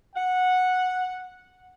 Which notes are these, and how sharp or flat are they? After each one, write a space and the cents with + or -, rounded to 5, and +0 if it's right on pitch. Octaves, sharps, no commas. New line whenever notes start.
F#5 -10